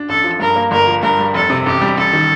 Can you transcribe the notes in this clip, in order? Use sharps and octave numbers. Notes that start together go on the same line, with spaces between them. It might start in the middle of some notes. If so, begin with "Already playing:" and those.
Already playing: D4
A1 A4
F3
G2 A#4
A#3
G1 A#4
F3
G2 A#4
G3
F1 A4
C3
A1 G4
G3
A1 A4
D#3